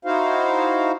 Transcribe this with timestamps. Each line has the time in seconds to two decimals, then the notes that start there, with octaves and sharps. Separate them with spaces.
0.05 D#4 E4 F#4 C5 F5